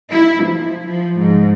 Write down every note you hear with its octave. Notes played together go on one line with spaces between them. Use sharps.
E4
F3
F3
G#2